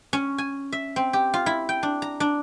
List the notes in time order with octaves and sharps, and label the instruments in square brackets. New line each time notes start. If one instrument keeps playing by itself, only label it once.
[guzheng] C#4
G#5
E5
C4
G4
F4
E4
G5
D4
A#5
D4